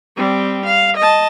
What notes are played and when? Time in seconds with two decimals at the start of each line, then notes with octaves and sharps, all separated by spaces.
0.17 G3 C4
0.66 F5
0.97 D#5 A5